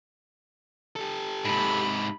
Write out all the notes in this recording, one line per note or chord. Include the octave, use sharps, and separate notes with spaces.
G4 A4
G#2 C3 B5